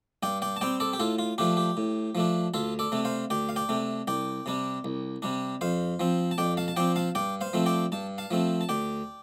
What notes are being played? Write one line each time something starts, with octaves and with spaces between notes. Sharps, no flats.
G2 D5 G5
D5 G5
A5
G3 C4 D5 G5
A4 D5
G4
A2 F4 A4
F4
F3 A3 D4 G4
G4
A2
F3 A3 D4
D2 F4 A4
A4 D5
C3 A3 D4
C5 F5
D2 D5 G5
F5
D5 G5
C3 A3 D4
C2 D5 G5
C3 G3 D4
C2
C3 G3 D4
F2 C5 F5
F3 C4
A5
F2 D5 G5
F5 A5
A5
F3 C4 D5 G5
F5 A5
G2 D5 G5
C5 F5
F3 A3 C4
D5 G5
G2 A5
F5 A5
F3 A3 C4
A5
D2 D5 G5